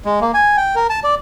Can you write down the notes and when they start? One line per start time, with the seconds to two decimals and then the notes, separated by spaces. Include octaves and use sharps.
0.05 G#3
0.21 A#3
0.34 G#5
0.57 G5
0.75 A#4
0.90 A5
1.04 D5